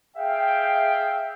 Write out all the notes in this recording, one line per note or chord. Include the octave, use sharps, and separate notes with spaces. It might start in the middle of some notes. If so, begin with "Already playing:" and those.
G#4 E5 F5 G5